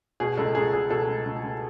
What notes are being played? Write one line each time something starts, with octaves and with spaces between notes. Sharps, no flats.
B2 G#4
C#2 A4
C#2 G#4
B2 G#4
B2 A4
C#2
C#2
C#2